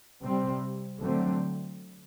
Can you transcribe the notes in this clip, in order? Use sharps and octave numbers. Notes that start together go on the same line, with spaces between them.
C3 G3 C4
D3 F#3 A3 C4